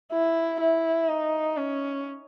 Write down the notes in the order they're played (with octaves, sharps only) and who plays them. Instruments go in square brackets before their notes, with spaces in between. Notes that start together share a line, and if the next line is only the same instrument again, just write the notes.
[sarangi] E4
E4
D#4
C#4